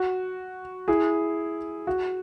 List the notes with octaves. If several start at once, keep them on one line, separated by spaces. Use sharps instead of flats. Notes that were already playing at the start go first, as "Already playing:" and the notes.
Already playing: F#4
E4 G#4
F#4